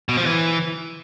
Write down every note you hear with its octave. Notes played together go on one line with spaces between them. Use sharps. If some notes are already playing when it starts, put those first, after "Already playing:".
B2
F3
E3